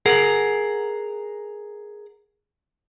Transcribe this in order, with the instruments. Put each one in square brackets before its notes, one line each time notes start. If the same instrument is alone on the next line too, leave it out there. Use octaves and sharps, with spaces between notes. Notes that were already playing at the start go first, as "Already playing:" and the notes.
[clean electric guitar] G#4 A#4 F#5